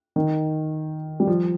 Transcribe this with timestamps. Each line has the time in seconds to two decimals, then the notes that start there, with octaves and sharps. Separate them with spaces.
0.16 D#3
1.20 G3
1.27 F3